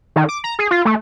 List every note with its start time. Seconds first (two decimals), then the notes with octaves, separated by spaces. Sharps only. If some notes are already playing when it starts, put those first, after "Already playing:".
0.16 D#3
0.29 D6
0.44 A#5
0.59 G#4
0.71 F4
0.85 A3